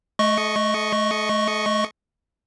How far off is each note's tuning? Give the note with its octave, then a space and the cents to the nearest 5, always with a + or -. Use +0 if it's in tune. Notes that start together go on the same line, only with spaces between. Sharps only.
A3 -35 D#5 +0 C#6 -5